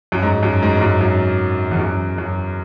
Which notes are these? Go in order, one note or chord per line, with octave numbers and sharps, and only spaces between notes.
F#2
G#2
F#2
G#2
G#2
F#2
F#2
E2
F#2
F#2